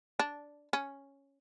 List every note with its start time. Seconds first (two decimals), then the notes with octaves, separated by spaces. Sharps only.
0.19 D4
0.73 C#4